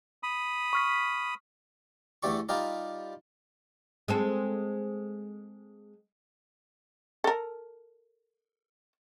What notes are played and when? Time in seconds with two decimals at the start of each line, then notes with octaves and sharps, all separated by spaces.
0.23 B5 D#6
0.73 C#6 F6 B6
2.23 E2 D3 A3 G4 D5 C#6
2.49 G3 D#4 F4 G4 A#4 D5
4.08 G#3 C4 A4
7.24 A4 A#4